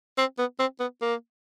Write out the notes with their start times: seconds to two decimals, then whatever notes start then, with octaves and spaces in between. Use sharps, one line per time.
0.18 C4
0.38 B3
0.59 C4
0.80 B3
1.01 A#3